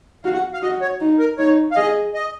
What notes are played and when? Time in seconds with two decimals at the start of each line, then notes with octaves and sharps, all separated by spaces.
0.24 F#4 F5
0.34 F#5
0.54 F5
0.62 F#4 D#5
0.82 C#5
1.00 D#4
1.19 A#4
1.38 D#4 C#5
1.72 F5
1.76 G#4 D#5
2.14 D#5